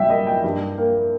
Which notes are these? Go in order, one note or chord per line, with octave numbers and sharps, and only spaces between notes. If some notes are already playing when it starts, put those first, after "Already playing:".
Already playing: G3 E5 G5
A#3 D#5
G5
G2
A#3